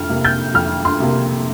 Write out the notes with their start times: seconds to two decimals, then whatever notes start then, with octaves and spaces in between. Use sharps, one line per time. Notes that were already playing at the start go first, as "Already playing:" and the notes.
Already playing: F2 F6
0.09 C3 A#3
0.25 G6
0.54 F2 F6
0.85 C6
1.00 C3 A#3